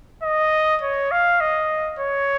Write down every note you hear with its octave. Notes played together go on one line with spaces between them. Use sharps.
D#5
C#5
F5
D#5
C#5